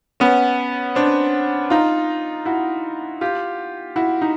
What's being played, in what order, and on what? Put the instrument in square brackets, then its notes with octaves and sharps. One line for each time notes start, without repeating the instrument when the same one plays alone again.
[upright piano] B3 C#4
C4 D4
D#4 F4
E4 F#4
F4 G4
E4 F#4
D#4